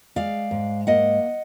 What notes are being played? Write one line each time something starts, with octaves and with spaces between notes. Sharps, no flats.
G#3 D5 F5
G#2
A#3 D#5 F#5